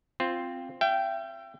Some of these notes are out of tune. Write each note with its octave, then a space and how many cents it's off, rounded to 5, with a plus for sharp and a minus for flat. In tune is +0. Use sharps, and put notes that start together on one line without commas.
C4 +0 F4 +0
E5 +40 G5 -10